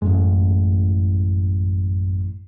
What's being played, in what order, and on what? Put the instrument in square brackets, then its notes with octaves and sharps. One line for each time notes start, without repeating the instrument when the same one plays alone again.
[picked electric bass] A1 A2 G#3 [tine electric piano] F#2